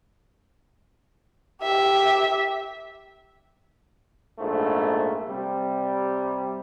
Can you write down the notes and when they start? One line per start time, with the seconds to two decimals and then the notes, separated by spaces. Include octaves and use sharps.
1.62 G4 E5
4.39 A#1 G#2 A3
5.28 C3 G3